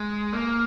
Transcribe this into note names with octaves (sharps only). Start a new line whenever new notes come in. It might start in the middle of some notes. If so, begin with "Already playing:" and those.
Already playing: G#3
A#3